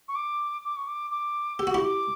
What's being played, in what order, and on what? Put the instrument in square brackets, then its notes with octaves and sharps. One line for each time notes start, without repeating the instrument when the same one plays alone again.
[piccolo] C#6
D6
D6
C#6
D6
D6
[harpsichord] G4 [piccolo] E6
[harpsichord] F#4
[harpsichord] E4 G4 [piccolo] C#6
[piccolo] D6